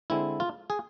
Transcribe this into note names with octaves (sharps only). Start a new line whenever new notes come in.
D3 G#3 C4 E4
F4
G#4